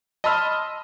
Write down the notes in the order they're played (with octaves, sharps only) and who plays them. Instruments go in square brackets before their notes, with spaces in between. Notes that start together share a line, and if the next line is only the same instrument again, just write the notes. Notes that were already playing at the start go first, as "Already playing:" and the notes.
[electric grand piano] D#5 A5 B5 C6 E6 F6